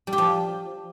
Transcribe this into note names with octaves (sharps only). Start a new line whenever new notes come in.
G3
G4
F3